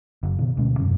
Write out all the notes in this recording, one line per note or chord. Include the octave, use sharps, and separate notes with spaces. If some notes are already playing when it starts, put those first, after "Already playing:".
F#1
B2 D#3
D2 B2 G#3 C#4
E1 F#2 C3